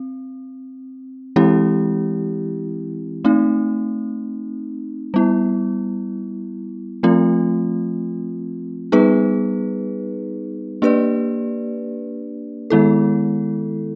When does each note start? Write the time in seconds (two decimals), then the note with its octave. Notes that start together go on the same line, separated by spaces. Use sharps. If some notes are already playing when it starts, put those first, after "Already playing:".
Already playing: C4
1.36 E3 G#3 C4 E4 G4
3.24 A3 C4 D#4
5.14 G3 B3 E4
7.03 F3 A3 C4 F4
8.92 G3 B3 D#4 G#4 B4
10.82 A#3 D4 G4 B4 D5
12.70 D#3 G#3 B3 E4 A4